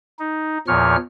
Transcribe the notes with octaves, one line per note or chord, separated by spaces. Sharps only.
D#4
E2 A#2 F3 C#5 F6